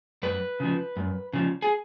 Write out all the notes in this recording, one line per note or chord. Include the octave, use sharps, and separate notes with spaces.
F#2 B4
C#3 F3
F#2
C#3 F3
G#4